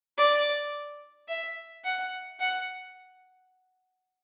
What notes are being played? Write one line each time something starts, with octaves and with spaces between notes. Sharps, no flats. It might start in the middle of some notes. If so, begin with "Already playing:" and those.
D5
E5
F#5
F#5